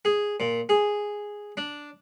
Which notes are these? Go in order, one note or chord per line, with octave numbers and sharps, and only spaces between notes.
G#4
A#2
G#4
D4